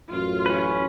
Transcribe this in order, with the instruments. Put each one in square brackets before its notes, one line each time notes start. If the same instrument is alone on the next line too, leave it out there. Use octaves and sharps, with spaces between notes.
[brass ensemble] A1 F#2 [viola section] F4
[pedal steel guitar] C#4 B4